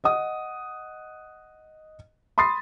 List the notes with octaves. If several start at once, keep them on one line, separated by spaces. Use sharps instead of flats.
D#5 F#5 D#6
B5 C6 D#6 A6 C7